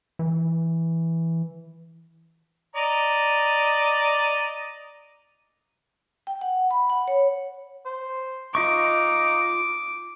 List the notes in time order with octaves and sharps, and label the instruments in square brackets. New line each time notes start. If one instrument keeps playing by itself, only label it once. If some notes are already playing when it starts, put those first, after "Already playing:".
[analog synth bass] E3
[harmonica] D5 D#5 A#5
[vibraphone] G5
F#5
B5
F#5
C#5
[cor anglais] C5
[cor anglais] D#4 [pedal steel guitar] F4 D#5 C#6 [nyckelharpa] D6